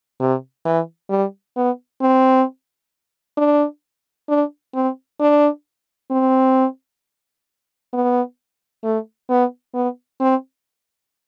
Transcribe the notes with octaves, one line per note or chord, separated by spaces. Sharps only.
C3
E3
G3
B3
C4
D4
D4
C4
D4
C4
B3
A3
B3
B3
C4